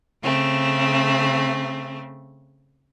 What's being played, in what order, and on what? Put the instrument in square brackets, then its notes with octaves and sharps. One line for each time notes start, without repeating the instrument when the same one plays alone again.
[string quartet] C#3 A3 C4